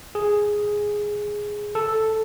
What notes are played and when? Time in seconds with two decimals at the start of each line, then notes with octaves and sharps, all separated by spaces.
0.15 G#4
1.75 A4